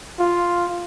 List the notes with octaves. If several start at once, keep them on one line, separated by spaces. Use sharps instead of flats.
F4